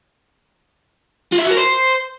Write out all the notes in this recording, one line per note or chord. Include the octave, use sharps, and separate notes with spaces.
F4
E5
F#4
A#4
C5